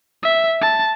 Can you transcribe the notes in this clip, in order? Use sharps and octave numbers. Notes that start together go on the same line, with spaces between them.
E5
A5